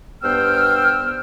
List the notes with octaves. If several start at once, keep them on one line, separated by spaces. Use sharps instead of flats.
G2 B3 C5 G5 E6 F6